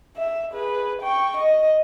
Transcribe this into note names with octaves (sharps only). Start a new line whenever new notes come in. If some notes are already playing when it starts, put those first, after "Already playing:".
E5
G#4 B4
G5 C#6
D#5